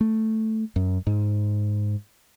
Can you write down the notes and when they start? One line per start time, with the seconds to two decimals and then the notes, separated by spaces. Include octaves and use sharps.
0.01 A3
0.76 F#2
1.07 G#2